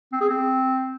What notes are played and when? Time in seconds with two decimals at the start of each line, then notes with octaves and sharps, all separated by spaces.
0.12 C4
0.21 G#4
0.29 C4